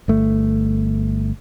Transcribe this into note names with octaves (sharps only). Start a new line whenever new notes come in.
G1 A3